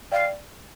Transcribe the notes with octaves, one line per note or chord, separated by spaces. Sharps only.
D5 F5 G5